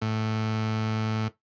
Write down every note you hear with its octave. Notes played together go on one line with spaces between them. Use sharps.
A2